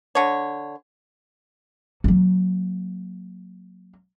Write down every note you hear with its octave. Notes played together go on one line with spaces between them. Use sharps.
D3 C#5
F#3 A#3